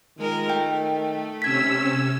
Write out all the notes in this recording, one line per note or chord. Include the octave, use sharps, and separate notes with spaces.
D#3 G#3 F4 A#4
A3 G5
C3 C#4 E6 G#6 B6